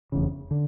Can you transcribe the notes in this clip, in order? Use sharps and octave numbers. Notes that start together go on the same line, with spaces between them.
F1 E2 C#3
D3